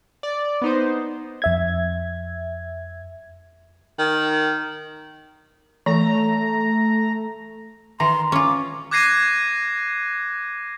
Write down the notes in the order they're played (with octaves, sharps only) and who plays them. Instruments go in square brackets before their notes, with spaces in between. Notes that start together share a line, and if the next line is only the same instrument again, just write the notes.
[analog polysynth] D5
B3 D#4 C5
[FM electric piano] F2 E5 G#6
[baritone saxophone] D#3
[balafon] E3 [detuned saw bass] A3 [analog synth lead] A#5
[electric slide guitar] D#3 A#5 [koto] E3 [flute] C6
[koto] C#4 F4 [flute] D6
[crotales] D6 F#6 G#6 A#6 C7 D#7